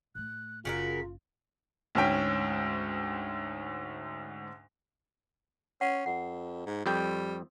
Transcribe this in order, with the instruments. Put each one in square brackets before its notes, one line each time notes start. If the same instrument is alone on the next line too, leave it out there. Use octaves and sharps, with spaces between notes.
[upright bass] A2 A3 [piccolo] F#6
[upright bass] F#1 [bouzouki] C#3 F#4 A#4 [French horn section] F4 [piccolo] B6
[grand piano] D2 G#2 C#4 G5 B6
[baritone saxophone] C#4 [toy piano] F#5
[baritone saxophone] F2 [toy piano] F#5
[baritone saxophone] G#2
[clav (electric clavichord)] F2 G5 [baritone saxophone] G3